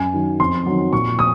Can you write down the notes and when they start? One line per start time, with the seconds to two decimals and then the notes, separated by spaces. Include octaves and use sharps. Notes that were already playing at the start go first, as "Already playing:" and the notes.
Already playing: F#2 G#5
0.14 D#3 F#3
0.40 F2 C6
0.66 D#3 F#3
0.92 A#2 C#6
1.18 F3 D#6